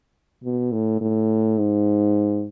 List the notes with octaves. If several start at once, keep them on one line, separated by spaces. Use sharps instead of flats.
B2
A2
A2
G#2